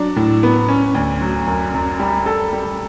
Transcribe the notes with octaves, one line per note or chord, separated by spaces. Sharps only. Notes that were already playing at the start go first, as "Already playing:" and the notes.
Already playing: F#3 D4
A2
B3
C#4
D2
F#3
F#2
F#2
G3
A4
G3